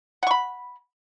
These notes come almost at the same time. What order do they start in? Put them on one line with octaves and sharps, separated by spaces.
F#5 C#6 B5